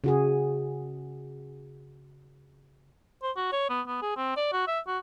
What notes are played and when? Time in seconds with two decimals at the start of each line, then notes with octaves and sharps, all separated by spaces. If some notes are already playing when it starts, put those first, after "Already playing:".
0.04 C#3 F#4 G#4
3.22 C5
3.36 F#4
3.52 C#5
3.70 B3
3.87 B3
4.02 G#4
4.17 C4
4.37 D5
4.52 F#4
4.67 E5
4.87 F#4